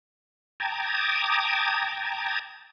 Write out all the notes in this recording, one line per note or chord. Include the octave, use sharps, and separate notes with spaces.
G5 A5 A#5 D6 D#6 G#6